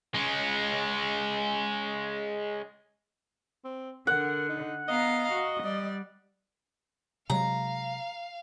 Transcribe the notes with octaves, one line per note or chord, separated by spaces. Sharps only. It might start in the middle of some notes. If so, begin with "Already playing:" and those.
G#3 C#4
C4
D3 A#4 F#5
D#4
B3 D#5 F5 A#5
F#4
G3 D5
C3 F#3 G#3 F5 A#5